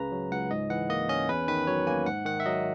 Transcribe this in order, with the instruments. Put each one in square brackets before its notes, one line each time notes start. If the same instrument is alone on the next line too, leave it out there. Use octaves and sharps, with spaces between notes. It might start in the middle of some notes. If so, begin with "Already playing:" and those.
Already playing: [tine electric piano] C#2 C#3 B4 A#5
F#3
C#2 F#5
G#2 D#5
E3 F#5
A#3 D#5
C#4 D#5
E2 B4
D#3 B4
F#3 C#5
A#3 G#5
G#2 F#5
D#3 F#5
E5
F#3 D#5